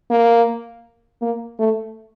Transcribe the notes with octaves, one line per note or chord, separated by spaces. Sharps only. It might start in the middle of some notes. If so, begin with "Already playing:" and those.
A#3
A#3
A3